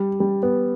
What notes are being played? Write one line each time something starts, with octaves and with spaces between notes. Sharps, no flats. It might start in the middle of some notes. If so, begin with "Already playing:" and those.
Already playing: G3
G3
B3